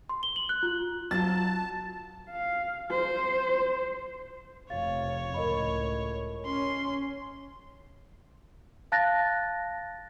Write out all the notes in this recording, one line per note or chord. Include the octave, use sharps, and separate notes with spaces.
C6
G7
F#7
F#6
F4
F#3 C4 F4 A5 A6
F5
C5
F1 F2 C#5 F5 A6
C#2 A2 A#4 D#5 B5
C#4 C6
F5 A5 F#6 A6 A#6